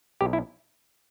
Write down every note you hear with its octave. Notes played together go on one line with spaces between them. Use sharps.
B1 G4
E4